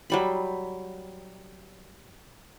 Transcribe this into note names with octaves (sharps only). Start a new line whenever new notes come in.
F#3 G3 B5